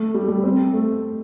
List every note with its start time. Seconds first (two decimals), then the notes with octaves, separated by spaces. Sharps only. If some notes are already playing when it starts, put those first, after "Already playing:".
Already playing: A3
0.14 G3
0.28 G3
0.43 C4
0.73 A3